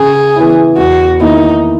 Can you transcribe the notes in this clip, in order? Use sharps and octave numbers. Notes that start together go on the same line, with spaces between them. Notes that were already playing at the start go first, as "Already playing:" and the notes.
Already playing: C#3 G#4
E3 B3 E4
E2 F#4
D#3 A#3 D#4 E4